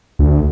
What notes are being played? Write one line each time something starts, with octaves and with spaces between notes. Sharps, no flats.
D2